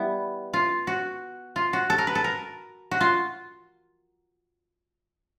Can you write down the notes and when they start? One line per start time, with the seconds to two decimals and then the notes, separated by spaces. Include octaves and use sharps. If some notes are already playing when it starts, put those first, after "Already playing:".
Already playing: G3 B3 E4
0.53 F4
0.87 F#4
1.56 F4
1.73 F#4
1.90 A4
1.98 A#4
2.07 B4
2.15 A4
2.24 A#4
2.91 F#4
3.01 F4